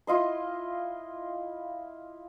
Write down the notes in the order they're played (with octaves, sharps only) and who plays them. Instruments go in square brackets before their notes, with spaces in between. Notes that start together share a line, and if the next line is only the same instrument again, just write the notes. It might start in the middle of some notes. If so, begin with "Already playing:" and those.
[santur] E4 F4 D#5 C6